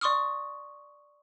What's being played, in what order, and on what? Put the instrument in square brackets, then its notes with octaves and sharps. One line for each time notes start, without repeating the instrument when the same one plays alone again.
[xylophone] D5 C6 C#6 D#6 F6